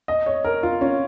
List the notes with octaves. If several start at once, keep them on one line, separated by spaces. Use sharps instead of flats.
D#5
C#5
A#4
F4
C#4